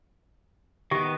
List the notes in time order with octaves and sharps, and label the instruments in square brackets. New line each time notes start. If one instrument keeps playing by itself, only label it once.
[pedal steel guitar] D#3 B3 [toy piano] G4